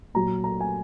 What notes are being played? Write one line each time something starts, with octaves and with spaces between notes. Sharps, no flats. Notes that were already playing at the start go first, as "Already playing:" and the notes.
A#2 F#3 A#5
A#5
G#5